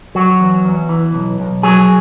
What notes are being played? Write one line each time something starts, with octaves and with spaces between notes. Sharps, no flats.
F#3 F#4
E2
E2
E3
B1
B1
F#3 G#4